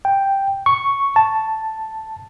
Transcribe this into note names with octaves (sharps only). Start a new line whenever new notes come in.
G5
C#6
A5